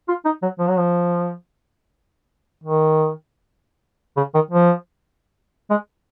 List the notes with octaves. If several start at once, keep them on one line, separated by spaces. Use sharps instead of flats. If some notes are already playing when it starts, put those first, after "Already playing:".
F4
D#4
F#3
F3
F#3
F3
D#3
C#3
D#3
F3
G#3